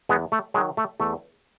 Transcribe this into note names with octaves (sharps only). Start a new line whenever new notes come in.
E2 G#3 B3
A3
D#3 F#3 G#3
A3
E2 A3